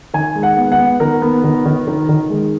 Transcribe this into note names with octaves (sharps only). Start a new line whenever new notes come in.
D#3 G#5
G#3
F#5
B3
F#5
B3
D#3 A#4
B3
D#3
D#3
D#3
D#3
G#3